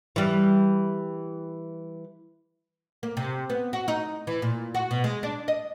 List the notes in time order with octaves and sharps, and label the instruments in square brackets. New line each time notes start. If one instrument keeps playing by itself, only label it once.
[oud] E3 G3
A#3
C3
B3
F#4
D#4
E3
A#2
F#4
B2
G#3
D4
D#5